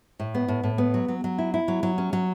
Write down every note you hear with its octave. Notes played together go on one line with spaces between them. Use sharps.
A2
B3
A2
A2
B3
F#3
F#3
F#3
E4
E4
F#3
F#3
C#4
F#3